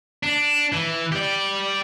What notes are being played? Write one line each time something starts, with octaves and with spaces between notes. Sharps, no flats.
D4
E3
G4 D5